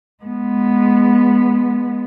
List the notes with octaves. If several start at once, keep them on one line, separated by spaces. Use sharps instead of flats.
G#3 B3